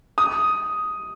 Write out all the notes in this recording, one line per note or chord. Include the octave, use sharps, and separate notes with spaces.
D#6